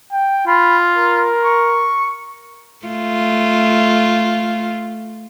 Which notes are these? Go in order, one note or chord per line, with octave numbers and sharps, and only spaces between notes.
G5
F4 B5
A#4
C#6
A3 F4